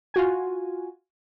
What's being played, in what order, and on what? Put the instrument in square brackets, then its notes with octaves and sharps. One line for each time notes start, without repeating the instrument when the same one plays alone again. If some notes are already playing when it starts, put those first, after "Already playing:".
[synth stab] F4 F#4 G#5